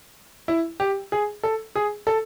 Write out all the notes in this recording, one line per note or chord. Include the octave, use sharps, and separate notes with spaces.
E4
G4
G#4
A4
G#4
A4